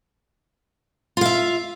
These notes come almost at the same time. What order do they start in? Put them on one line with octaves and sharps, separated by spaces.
F4 F5 E5